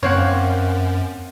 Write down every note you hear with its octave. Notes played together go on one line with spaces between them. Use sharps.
F#2 A#3 C4 C#5 F#5